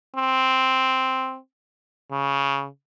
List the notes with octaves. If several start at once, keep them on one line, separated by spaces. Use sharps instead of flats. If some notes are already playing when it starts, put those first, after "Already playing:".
C4
C#3